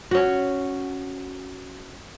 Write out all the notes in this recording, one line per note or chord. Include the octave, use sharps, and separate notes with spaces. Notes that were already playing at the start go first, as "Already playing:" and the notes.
C#4 F#4